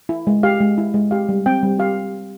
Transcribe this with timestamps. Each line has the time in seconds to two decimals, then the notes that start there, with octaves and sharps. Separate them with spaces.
0.09 E4
0.27 G#3
0.43 G4 F5
0.60 G#3
0.78 E4
0.94 G#3
1.11 G4 F5
1.29 G3
1.46 C4 G5
1.63 G3
1.79 G4 F5